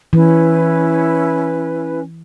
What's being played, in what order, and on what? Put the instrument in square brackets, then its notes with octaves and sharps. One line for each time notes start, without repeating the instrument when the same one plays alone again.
[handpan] E3 [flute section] C#4 E4 B4